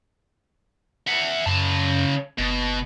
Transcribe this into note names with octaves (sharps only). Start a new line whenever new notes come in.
E5 F#5
F#2 C#3 A5
F#1 B2